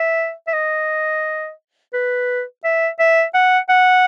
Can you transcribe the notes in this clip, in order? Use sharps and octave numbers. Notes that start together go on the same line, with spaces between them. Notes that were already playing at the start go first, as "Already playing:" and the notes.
Already playing: E5
E5
D#5
B4
E5
E5
F#5
F#5